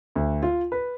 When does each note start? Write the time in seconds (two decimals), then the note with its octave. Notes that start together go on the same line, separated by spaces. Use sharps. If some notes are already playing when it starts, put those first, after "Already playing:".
0.16 D2
0.43 F4
0.72 B4